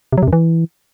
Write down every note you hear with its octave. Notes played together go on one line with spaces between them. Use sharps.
C3
F#3
C3
F#2
E3